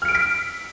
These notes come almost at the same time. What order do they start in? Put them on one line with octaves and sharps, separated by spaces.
F6 C#7 D7 E6 B6